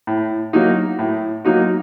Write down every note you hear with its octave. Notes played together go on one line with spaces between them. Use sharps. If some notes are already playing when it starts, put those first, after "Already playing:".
A2
F#3 A#3 D#4 F#4
A2
F#3 A#3 D#4 F#4